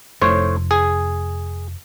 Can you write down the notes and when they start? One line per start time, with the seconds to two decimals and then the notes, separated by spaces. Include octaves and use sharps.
0.22 F1 A2 C5 C#5
0.71 G#4